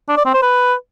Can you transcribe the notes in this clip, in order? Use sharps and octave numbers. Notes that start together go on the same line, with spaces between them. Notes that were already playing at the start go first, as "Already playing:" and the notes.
D4
D5
C4
C5
B4